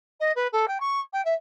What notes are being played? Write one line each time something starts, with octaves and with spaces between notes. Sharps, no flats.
D#5
B4
A4
G5
C#6
G5
E5